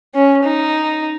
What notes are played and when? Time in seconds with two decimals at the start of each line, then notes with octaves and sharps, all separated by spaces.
0.14 C#4
0.44 D#4